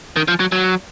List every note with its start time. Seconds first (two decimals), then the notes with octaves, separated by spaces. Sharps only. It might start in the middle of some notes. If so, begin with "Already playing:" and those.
0.16 D#3
0.28 F3
0.40 F#3
0.52 F#3